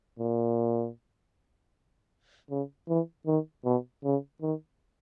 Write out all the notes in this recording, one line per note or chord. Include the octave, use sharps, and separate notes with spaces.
A#2
C#3
E3
D#3
B2
C#3
D#3